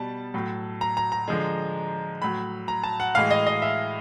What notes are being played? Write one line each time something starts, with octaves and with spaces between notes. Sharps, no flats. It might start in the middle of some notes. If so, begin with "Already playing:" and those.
Already playing: B2 G3 A5
A2 F#3
A#5
A#5
A#5
D3 F3 G#3
A2 F#3 B5
A#5
A5
F#5
A2 E3 G#3 F5
D#5
D#5
E5